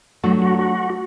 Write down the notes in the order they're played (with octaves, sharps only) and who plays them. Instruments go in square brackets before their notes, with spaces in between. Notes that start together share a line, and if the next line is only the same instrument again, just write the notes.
[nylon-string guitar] F#3 A3 D4 [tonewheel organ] F#4
[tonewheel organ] F#4
F#4